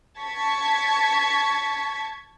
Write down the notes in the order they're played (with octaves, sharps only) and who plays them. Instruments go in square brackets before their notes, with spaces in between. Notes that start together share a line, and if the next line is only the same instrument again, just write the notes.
[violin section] A5 C#6 G#6 B6